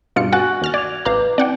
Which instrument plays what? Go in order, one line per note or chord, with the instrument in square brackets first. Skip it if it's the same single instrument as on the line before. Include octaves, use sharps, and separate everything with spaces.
[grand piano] G2 [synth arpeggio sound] B2 F4 C#7
[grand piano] F#4 G#5 F#6 [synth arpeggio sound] F#5 A6
[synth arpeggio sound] D#2 F6 A6
[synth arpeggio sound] D5 [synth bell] G#6 F7
[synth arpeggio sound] A1 F5 A#5 [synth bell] B4 D6
[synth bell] C4 [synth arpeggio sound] D5 F#5 G5